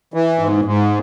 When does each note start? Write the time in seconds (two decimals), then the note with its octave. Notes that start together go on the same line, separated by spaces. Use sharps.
0.14 E3
0.39 G#2
0.65 G#2